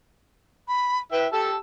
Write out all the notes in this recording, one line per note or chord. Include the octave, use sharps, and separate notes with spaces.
B5
E4 B4 E5 G5
G4 A4 A5 E6